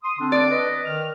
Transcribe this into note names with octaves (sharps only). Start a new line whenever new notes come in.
C6 D#6
D3 C4 D4
D5
B4 D#5
D#3 F6